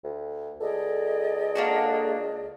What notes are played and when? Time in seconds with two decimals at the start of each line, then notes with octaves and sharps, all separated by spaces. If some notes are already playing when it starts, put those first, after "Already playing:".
0.04 D2
0.60 C#2 G#4 A4 D5 D#5
1.55 A#3 D4 F#4